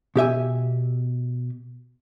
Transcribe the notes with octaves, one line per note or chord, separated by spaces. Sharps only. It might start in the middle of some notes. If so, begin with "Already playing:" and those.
B2 G4 E5 G#5